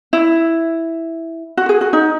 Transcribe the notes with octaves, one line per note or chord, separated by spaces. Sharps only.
E4
F#4
G#4
F#4
D#4